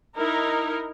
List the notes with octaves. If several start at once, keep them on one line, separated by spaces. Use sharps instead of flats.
D#4 E4 A#4